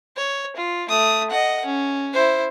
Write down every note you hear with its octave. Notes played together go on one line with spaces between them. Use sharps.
C#5
F4
A3 D#6
D#5 F#5
C#4
E4 C5